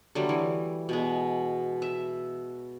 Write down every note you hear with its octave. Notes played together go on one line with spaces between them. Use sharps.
D3 F#3 G3 A3
E3
B2 G#3
E5